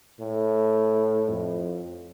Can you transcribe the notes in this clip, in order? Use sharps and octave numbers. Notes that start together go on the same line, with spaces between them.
A2
F2